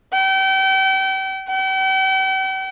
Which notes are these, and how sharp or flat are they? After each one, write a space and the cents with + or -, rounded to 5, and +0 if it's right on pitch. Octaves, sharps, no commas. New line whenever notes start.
G5 -35
G5 -45